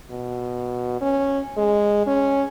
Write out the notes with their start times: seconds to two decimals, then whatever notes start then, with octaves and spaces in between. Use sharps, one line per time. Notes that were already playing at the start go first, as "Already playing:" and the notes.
0.11 B2
1.01 C#4
1.57 G#3
2.07 C#4